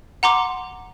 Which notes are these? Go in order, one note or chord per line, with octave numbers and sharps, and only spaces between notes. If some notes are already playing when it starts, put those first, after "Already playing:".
F#5 A#5 C6 D6